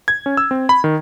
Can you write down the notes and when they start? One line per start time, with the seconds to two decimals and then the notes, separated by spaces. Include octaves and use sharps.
0.08 G#6
0.26 C#4
0.37 E6
0.51 C4
0.69 B5
0.84 D#3